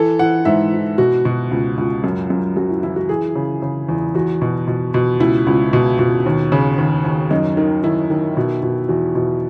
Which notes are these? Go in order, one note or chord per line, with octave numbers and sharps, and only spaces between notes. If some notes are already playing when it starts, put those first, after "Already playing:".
Already playing: E3 A4
E3 F#5
G#2 E5
E3
B2 F#4
B2
C#2
C#2
F#2
F#2
F#2 F#4
E4
E3 E4
F#4
E3 G#4
C#3
C#3
E2
E2 F#4
B2
B2
B2
C#2 E4
C#2
B2
B2
D#2
C#3
D#2
D#2
F#2 D#4
D#3
D#3 E4
D#3
B2
B2
E2 F#4
B2